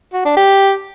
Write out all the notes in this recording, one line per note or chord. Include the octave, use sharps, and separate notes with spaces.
F#4
D4
G4